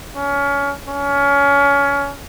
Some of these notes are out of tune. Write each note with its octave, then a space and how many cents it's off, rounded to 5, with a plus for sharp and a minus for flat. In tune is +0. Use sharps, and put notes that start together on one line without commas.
C#4 +25
C#4 +25